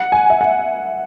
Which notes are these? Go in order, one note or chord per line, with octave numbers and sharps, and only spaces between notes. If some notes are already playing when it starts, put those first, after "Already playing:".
Already playing: F#5
G#5
E5
F#5